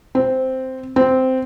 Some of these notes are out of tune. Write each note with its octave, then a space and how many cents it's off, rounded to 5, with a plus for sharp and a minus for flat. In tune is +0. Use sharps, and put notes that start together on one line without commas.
C4 -5
C4 -10